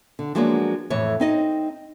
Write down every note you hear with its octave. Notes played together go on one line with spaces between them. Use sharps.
D3
F3 F#3 G#3 A#3 B3 D4
F2 A2 E3 C#5
C4 D#4 D#5